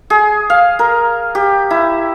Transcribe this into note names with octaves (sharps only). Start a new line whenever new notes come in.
G#4
F5
A#4
G4
E4